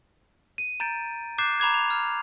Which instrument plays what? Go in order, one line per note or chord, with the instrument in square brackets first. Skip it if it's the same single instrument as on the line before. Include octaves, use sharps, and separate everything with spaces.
[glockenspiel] D#7
A#5 G6 A6 D7
D6 F#6 G6 A6 C7 E7
A#5 B5 D6 G#6
F7
F6